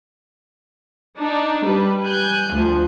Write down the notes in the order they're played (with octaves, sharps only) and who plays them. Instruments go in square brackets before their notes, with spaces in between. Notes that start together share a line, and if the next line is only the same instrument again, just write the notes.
[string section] D4 D#4
G3 B4
G#5 F#6 G6
D2 F3